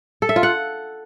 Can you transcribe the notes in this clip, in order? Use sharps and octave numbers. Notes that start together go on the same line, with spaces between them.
A4
E5
F4
F#5